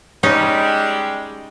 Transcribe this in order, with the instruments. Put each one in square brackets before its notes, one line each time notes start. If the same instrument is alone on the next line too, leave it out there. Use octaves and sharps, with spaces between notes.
[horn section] G3 G#3 [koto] C#4 D#4